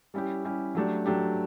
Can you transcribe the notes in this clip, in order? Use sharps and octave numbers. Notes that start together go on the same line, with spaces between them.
G3 C#4 E4 G4
G3 C#4 E4 G4
F#3 A3 D4 G4
F#3 A3 D4 G4